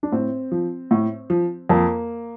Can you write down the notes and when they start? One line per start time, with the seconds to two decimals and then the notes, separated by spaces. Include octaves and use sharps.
0.03 D4
0.12 A2 C4
0.52 F3
0.91 A2
1.30 F3
1.69 F2 A#3